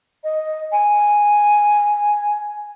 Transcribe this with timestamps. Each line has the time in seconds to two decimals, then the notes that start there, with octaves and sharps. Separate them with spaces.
0.24 D#5
0.72 G#5